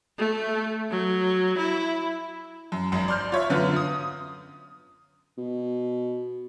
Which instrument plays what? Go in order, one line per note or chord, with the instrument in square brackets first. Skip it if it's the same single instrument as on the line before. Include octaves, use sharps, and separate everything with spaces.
[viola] A3
F#3
E4
[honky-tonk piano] F#2
G#1 F#2
D5 C6 F6 G6
F4 C#5 E5
F#2 D3 B3 F4
D#6
[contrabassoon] B2